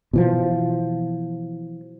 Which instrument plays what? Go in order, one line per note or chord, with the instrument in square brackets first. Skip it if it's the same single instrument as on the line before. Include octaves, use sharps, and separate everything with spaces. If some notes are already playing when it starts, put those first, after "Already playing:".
[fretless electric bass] B2 E3 F3